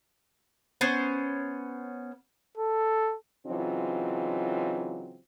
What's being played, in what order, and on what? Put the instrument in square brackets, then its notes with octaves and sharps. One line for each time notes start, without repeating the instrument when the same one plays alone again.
[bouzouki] B3 C#4 C5
[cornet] A4
[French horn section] C#3 E3 F#3 C4 D#4 F4